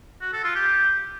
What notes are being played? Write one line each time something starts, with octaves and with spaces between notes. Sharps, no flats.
F#4
A4
F4
G4